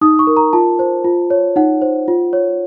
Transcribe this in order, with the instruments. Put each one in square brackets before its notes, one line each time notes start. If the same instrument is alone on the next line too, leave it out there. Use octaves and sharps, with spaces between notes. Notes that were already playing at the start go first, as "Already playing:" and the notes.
[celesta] D#4 D#6
C#6
A#4
A#5
F4 A5
C5
F4
C#5
D#4 F#5
C5
F4
C#5